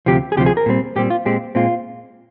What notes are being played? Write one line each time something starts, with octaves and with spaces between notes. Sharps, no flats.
D2 C3 F3 G4
G#4
D2 C3 F3 G4
G#4
A#4
A#2 G3 C4
A#2 G3 C4 G4
F4
A#2 G#3 C4 G4
A#2 G#3 C4 F4